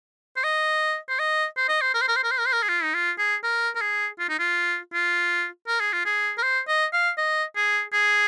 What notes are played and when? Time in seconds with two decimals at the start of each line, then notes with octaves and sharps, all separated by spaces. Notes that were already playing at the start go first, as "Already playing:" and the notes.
0.37 C5
0.44 D#5
1.09 C5
1.19 D#5
1.57 C5
1.68 D#5
1.81 C5
1.94 A#4
2.01 C5
2.08 A#4
2.16 C5
2.23 A#4
2.31 C5
2.38 A#4
2.46 C5
2.52 A#4
2.63 G#4
2.69 F4
2.83 D#4
2.94 F4
3.18 G#4
3.43 A#4
3.75 A#4
3.81 G#4
4.19 F4
4.29 D#4
4.39 F4
4.93 F4
5.68 A#4
5.80 G#4
5.93 F4
6.05 G#4
6.38 A#4
6.42 C5
6.68 D#5
6.93 F5
7.17 D#5
7.56 G#4
7.93 G#4